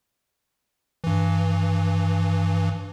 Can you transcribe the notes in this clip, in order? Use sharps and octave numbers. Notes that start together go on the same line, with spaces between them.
G2 E3